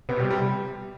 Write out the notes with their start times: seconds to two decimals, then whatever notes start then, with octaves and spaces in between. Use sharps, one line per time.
0.09 C3 B3
0.16 B2
0.19 G3
0.24 C3
0.30 G3